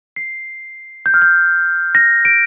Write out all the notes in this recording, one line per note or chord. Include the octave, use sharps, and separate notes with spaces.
C7
G6
F6
G6
A#6
D7